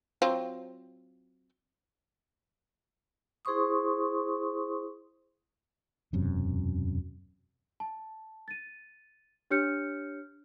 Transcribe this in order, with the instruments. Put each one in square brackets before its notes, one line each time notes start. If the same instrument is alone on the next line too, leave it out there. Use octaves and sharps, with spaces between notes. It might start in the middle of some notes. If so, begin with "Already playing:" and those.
[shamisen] F#3 C4 F4
[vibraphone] E4 G#4 C5 C6 C#6 D#6
[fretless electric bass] E1 F#2 C3
[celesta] A5
A6 D#7
D4 G4 C#5 F6 G6 C#7